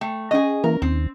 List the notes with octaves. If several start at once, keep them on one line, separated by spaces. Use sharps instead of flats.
A3 G5
C#4 G#4 D#5 C#6
E3 A#3 A#4
D#2 C4